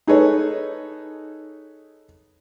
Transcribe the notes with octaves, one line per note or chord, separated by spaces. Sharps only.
D#4 G#4 A4 B4 C#5